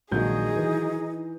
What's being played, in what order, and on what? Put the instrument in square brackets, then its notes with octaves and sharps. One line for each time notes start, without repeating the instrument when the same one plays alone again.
[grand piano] A#1 G#3 G6 [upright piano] D#3 F#3 [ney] D#4 [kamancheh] G#4
[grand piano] E3